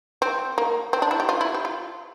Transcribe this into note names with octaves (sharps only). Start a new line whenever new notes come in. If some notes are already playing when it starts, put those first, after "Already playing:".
C4
A#3
C4
D4
E4
G4
F4
E4
G4
F4